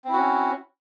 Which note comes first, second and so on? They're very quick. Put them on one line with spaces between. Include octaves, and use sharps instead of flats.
C4 E4 F#4 C#4